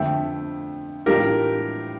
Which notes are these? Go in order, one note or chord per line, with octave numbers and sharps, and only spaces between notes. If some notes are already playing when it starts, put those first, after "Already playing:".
Already playing: F2 D3 F3 A3 E5 G5
A2 E3 G3 D4 F4 G4 A#4